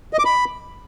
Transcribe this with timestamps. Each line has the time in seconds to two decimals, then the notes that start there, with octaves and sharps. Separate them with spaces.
0.13 D#5
0.19 D6
0.25 B5